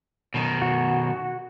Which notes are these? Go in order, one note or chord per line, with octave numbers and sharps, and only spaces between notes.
B2 D#3
F#4